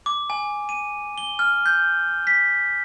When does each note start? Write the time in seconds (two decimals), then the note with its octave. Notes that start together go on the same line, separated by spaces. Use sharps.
0.06 D6
0.30 G#5
0.69 D#7
1.18 G7
1.39 F6
1.66 G6
2.27 B6